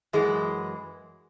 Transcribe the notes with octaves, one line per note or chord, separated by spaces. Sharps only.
F#2 E3 G#3